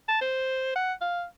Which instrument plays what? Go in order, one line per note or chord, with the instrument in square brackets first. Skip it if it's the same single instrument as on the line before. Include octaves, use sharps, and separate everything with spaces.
[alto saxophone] A5
C5
F#5
F5